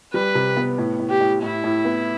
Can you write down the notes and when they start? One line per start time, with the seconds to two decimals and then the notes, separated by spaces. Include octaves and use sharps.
0.14 G3 B4
0.35 C3
0.57 B3
0.78 A2
0.99 A2
1.10 G4
1.21 A2
1.42 A2 E4
1.64 A2
1.85 B3